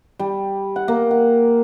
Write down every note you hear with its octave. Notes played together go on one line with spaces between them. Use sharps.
G3
F#5
A#3
F#5